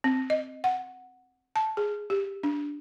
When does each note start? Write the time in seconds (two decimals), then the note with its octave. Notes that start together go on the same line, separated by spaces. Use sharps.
0.04 C4
0.30 D#5
0.64 F#5
1.56 A5
1.77 G#4
2.10 G4
2.43 D4